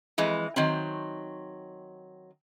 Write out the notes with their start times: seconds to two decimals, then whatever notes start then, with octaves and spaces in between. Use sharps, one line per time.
0.18 F2 E3 G#3
0.56 D#3 F#3 C4